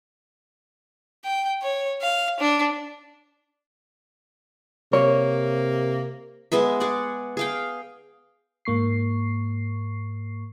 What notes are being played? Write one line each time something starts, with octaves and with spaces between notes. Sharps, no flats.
G5
C#5
F5
D4
C3 A#3 C#5
G#3 B3 G#4 E5
G#4 D5 F#5
G#4 F5 G5
G#2 A#3 C#6 C7